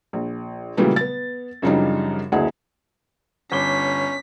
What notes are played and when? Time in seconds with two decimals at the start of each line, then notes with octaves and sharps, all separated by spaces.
0.13 A#1
0.77 A#2 C#3 E3 F#3 G3 A3
0.96 B3 A6
1.62 F#2 C#3 F3 G3 D4 D#4
2.32 F#1 D2 E4 G#4
3.52 G1 C#4 D6 B6 G7